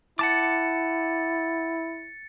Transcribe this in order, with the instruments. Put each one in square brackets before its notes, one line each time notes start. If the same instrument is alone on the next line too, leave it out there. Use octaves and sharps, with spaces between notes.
[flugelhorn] E4 [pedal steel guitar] F#5 A5 D6 [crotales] A6 C#7